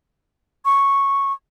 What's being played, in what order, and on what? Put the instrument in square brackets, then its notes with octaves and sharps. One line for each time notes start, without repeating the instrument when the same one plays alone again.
[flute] C#6